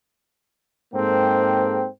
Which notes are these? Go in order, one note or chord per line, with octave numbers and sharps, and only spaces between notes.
G#2 G#3 A#3 C4 A4 G5